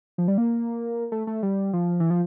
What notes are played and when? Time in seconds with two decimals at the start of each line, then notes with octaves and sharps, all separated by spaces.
0.18 F3
0.28 G3
0.38 A#3
1.12 A3
1.27 A3
1.43 G3
1.73 F3
2.00 E3
2.10 F3